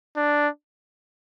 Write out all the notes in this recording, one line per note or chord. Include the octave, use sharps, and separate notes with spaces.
D4